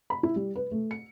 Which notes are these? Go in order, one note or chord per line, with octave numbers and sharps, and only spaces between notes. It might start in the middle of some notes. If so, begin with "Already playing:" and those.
B5
E4
G3
B4
A3
C#7